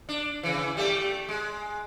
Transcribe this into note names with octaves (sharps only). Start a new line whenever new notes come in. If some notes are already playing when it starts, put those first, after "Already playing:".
D4
C#3 E3
G3 A3
G#3